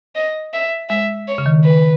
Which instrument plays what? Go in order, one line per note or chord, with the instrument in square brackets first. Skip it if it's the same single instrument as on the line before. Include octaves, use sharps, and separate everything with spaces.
[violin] D#5
E5
[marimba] G#3 [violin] E5
[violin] C#5
[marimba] C#3
D#3
[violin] B4